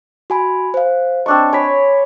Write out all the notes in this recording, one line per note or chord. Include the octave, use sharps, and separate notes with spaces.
F#4 G#5 B5
C5 F5
C4 D4 D#5 C#6
C#5 G#5 B5 B6